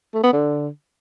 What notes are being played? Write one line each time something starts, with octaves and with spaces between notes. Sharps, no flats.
A3
B3
D3